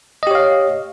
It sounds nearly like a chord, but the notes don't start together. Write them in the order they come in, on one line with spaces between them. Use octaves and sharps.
D#5 G4 C#5 F5